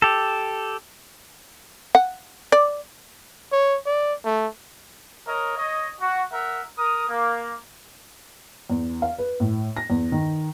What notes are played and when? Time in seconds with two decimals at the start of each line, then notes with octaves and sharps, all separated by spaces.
0.02 G4 A4
1.95 F#5
2.52 D5
3.52 C#5
3.86 D5
4.25 A3
5.27 A#4 C#5 D#5
5.57 C#5 D#5
5.99 F#4
6.31 A#4 E5 F#5
6.78 A#4 D#6
7.09 A#3
8.70 E2
9.02 F5
9.18 B4
9.40 A2
9.77 A#6
9.90 E2
10.12 D#3